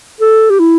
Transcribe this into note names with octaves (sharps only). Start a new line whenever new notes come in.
A4
G4
E4